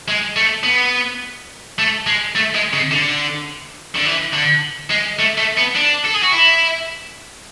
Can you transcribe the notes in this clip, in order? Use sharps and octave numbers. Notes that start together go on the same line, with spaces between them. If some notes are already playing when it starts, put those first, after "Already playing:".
G#3
A3
B3
A3
G#3
A3
G#3
C#3
D3
D3
E3
D3
G#3
A3
A3
B3
D4
A4
G#4
F#4
E4